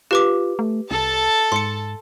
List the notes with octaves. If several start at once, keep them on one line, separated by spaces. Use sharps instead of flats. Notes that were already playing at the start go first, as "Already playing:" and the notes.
F4 G4 B4 D6
A3
C2 A4 A5
G#2 C6 C#7